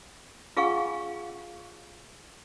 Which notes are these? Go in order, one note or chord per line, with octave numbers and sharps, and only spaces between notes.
F4 G#4 F5 F#5 G#5 C#6